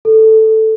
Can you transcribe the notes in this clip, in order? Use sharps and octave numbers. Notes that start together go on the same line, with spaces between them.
A4